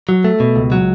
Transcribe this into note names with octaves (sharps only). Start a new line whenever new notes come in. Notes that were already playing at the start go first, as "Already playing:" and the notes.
F#3
A3
B2
C#2
F#3